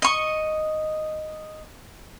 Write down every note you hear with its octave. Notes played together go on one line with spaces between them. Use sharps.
D#5 C#6